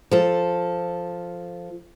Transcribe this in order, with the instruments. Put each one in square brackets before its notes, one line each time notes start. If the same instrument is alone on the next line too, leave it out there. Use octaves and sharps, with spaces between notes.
[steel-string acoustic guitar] F3 A4